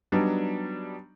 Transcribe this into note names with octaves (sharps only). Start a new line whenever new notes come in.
F#3 G3 B3 D4 D#4